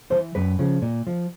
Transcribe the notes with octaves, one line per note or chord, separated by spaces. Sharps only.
E3 C5
F#2 B4
C#3 F3
A#2
F3